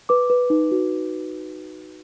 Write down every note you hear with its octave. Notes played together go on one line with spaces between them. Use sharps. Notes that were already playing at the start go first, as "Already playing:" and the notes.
B4 D6
B4
D#4
F#4